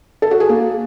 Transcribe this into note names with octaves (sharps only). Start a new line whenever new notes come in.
A4
F#4
G#4
A#3